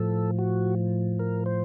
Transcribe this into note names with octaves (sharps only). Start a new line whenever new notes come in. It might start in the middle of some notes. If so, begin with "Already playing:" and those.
Already playing: A2 F3 A4
F#4
A#4
C5